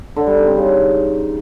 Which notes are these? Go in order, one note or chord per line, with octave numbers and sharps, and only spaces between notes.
D3
G3
D#4
C4
C#3